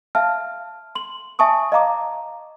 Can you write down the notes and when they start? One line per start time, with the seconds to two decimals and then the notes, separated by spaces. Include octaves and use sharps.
0.15 E5 F5 A5 F6
0.95 C6 F#7
1.39 E5 G#5 A5 C#6 D#6
1.72 D#5 F5 A#5 D6